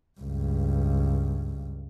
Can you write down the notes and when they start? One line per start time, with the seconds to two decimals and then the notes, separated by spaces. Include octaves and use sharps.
0.20 C#2 G2